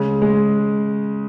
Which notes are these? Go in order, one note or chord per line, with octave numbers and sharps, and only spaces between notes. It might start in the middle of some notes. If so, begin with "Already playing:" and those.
Already playing: C#3 G#3
G#3